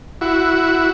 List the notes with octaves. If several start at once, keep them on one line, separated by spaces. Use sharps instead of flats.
E4 F#4